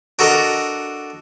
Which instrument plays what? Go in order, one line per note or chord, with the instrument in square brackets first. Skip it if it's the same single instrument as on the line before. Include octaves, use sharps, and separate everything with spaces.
[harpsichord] D4 F#4 A4 A#4 D#5